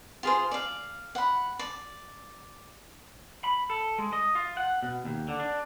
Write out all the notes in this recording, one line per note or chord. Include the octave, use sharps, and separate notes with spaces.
F4 G#4 C5
D5 F5
F#5 B5
D5
B5
A4
G#3
D#5
F4
F#5
B2
D#2
D3
D4